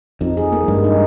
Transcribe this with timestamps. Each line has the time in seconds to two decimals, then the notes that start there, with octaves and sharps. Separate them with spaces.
0.21 F2 D#4
0.37 G#4
0.52 A#3
0.68 G2 G#3
0.84 D#4